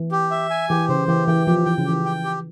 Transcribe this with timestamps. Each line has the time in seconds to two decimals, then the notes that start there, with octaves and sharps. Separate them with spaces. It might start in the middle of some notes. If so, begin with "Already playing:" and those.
Already playing: E3
0.12 G4
0.31 E5
0.50 G#5
0.69 E3 G4
0.89 C#3 C5
1.08 E3 G4
1.27 E3 G5
1.47 F3 G4
1.66 E3 G5
1.78 C#3
1.85 E3 G4
2.05 G5
2.24 G4